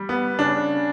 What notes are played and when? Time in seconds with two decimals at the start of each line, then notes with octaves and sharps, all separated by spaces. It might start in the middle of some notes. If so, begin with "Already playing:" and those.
Already playing: G3
0.09 B3
0.39 C#3 D4